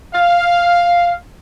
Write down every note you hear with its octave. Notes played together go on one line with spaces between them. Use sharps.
F5